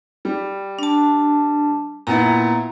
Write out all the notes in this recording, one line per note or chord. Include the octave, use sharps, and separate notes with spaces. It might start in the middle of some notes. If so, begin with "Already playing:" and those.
G3
D4 A5
A#2 B3 E4 A#5